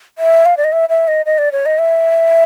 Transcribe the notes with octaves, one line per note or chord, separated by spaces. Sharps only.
E5
F5
D5
D#5
E5
E5
D#5
D#5
D5
C#5
D#5
E5